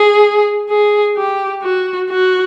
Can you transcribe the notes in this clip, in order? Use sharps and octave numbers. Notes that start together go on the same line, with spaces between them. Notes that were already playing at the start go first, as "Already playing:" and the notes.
Already playing: G#4
G#4
G4
F#4
F#4